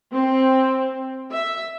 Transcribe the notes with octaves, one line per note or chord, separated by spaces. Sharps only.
C4
E5